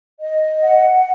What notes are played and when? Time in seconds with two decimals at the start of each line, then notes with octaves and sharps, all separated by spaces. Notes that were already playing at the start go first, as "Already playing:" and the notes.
0.20 D#5
0.62 F#5